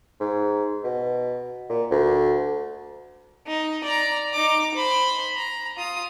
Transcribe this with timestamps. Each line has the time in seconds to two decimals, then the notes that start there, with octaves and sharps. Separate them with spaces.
0.20 G#2
0.84 B2
1.70 A#2
1.91 D2
3.47 D#4
3.84 D5 A#5
4.32 D#4 D6
4.74 C5 B5
5.36 A#5
5.77 F4 D#6